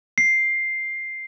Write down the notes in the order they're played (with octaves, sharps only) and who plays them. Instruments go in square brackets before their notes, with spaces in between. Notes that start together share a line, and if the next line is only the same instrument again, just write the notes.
[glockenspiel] C7